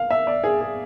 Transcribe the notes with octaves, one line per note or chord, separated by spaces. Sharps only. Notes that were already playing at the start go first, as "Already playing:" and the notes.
Already playing: F5
E5
D5
G#4
G#4